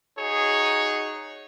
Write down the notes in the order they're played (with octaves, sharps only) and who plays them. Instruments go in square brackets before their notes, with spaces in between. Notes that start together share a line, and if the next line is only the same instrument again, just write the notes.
[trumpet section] D#4 F#4 G#4 C#5